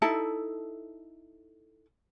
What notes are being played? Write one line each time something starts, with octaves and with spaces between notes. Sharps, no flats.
D#4 E4 A4 A5